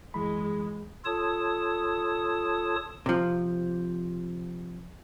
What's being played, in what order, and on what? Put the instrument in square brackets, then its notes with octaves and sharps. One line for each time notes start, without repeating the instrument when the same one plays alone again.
[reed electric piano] F#2 E3 B5 [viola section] G#3
[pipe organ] F4 A4 C#5 A5 D#6
[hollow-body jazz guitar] C3 F3